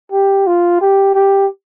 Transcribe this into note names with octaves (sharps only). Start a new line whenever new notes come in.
G4
F4
G4
G4